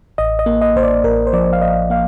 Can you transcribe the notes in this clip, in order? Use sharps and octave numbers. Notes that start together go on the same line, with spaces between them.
A1 D#5
D#5
A#3
D#5
A1 C5
D5
A1 A#4
C5
F3 D5
F5
A1 D#5
A#3 F5